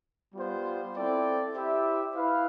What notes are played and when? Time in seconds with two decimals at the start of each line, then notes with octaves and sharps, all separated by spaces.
0.34 G3 B3 F4 C5
0.94 C4 E4 A4 D5 G5
1.54 E4 G4 C5 E5
2.15 E4 B4 F5